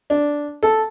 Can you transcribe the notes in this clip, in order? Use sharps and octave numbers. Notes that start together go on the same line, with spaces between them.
D4
A4